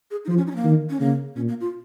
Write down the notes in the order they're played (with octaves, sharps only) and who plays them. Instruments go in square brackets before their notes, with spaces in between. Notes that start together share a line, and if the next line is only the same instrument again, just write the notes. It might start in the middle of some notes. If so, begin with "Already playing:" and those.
[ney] G#4
D#4
[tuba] F3 [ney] F4
[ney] C#4
D#4
C#4
A#3
[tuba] D#3
[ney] C#4
[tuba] C#3 [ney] A#3
[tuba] A#2 [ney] C#4
[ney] A#3
F4